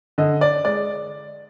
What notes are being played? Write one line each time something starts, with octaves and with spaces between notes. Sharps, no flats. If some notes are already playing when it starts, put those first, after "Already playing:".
D3 D#5
D5
G#3 D5